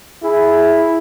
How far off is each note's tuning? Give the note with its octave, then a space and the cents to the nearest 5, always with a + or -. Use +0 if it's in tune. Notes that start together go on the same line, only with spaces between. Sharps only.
E4 +0 G#4 +5